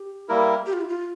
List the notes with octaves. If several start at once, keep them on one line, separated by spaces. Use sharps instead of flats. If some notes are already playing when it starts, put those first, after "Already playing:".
Already playing: G4
G3 A#3 E4 A#4
G4
F4
E4
F4